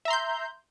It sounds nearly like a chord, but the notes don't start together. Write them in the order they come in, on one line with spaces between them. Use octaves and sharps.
E5 A#5 C6 G6